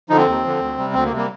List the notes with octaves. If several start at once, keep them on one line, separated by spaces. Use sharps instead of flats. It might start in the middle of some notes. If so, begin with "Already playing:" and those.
D3 F3 D#4
C4
D#2
D3 F3
D2
C3 G3
D2 C4
A#3
C3
G3 A#3